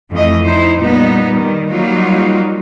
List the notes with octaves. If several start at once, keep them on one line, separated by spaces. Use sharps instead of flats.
F2 E3 A3 D#5
D#4 E4 C5
A#2 G3 B3 D#4
D#3 G3
F#3 G3 A#3 D#4 F4 F#4